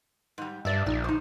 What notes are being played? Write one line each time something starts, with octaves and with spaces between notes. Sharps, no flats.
G#2 G3
G2 D5 E5
A#1 D#4
D#4 C5